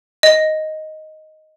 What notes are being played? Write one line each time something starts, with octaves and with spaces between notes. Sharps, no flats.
D#5